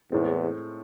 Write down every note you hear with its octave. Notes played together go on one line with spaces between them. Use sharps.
E2 A2 G#3 C4